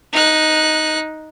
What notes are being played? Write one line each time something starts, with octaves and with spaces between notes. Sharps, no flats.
D#4 F#6